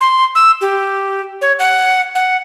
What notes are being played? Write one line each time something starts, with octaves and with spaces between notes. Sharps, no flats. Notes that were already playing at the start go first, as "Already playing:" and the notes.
C6
E6
G4
C#5
F#5
F#5